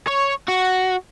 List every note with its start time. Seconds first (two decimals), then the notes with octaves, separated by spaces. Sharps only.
0.07 C#5
0.48 F#4